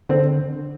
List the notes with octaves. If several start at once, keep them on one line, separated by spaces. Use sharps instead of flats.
D3 C4